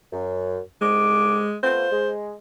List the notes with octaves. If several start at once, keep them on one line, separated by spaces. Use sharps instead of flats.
F#2
C2 G#2 G#3 D6
A3 B3 F4 C5
G#3